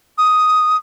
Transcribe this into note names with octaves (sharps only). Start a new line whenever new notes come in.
D#6